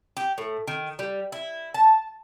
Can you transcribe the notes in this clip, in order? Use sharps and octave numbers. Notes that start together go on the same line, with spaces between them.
G4
A2
D#3
G3
E4
A5